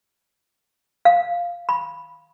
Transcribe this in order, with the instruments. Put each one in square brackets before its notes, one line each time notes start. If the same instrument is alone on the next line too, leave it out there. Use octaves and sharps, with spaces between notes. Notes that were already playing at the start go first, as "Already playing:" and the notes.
[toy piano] F5
B5